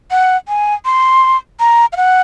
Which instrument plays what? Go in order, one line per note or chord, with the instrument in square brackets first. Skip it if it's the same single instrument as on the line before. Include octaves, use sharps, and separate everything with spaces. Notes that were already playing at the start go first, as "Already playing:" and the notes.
[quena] F#5
G#5
C6
A#5
F5
F#5